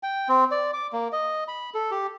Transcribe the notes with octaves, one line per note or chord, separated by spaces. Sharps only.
G5
C4
D5
D6
A#3
D#5
B5
A4
G4